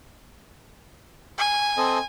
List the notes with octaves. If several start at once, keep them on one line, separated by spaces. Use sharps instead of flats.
G#5
C4 A4 D#5